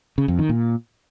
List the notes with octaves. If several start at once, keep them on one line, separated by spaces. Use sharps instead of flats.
C#3
F2
D#3
A#2